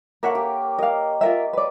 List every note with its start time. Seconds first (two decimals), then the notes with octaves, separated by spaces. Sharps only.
0.23 A#3 A#4 C#5 E5 F#5
0.35 G4
0.78 A#4 D#5 F5
1.21 F4 A#4 E5
1.53 B4 D5